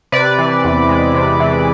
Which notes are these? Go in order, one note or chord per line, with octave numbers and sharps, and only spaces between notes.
C3 B4 D5
E3
E2
G#3
C3
E3